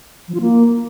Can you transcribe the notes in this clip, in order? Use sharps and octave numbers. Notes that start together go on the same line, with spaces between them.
F3
F4
A#3